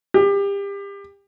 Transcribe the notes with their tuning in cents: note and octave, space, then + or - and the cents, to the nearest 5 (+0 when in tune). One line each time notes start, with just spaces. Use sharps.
G4 +30